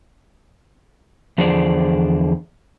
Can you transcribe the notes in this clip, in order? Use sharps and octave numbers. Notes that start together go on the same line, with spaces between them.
E2 D3 F3 G#4 C5 D5